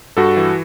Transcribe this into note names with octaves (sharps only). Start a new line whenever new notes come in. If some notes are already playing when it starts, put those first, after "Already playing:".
G2 F#4 A4
E3